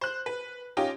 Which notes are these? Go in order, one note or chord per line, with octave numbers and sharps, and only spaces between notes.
C5 F#6
B4
C#4 D#4 F4 G4